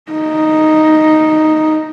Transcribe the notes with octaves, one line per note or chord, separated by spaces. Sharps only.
D#4